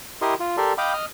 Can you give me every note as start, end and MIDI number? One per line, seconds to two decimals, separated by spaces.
0.22 0.34 64
0.22 0.34 67
0.22 0.34 70
0.22 0.34 75
0.22 0.34 84
0.40 0.56 65
0.57 0.73 67
0.57 0.73 69
0.57 0.73 70
0.57 0.73 74
0.57 0.73 84
0.78 0.93 75
0.78 0.93 77
0.78 0.93 79
0.78 0.93 83
0.78 0.93 86
0.93 1.05 75
0.93 1.05 89